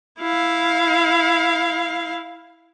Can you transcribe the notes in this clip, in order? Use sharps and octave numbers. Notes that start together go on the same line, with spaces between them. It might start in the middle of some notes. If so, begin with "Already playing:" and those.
E4 F5